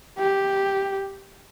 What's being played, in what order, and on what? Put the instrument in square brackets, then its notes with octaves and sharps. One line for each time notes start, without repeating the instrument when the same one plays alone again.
[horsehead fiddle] G4